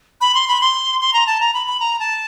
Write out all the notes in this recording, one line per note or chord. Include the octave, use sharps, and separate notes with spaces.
B5
C6
B5
C6
C6
A#5
A5
A#5
B5
B5
A#5
A5